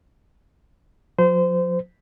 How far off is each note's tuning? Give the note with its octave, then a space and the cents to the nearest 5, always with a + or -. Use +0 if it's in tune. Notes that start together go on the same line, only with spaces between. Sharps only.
F3 +45 C5 -25